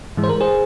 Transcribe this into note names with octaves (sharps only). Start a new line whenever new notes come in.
G#2 E3 G#3
C5
A#4
G#4 C5